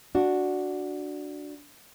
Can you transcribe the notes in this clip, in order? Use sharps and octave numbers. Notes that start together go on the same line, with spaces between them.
D4 F#4